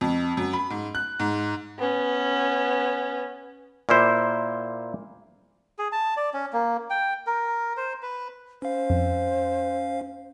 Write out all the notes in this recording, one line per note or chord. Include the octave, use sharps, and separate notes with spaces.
F2
F#2
B5
G#2
F#6
G#2
B3 C#4
A#2 A#3 E4 C5
G#4
A5
D5
C#4
A#3
G5
A#4
C5
B4
C#4 C5 F5
F2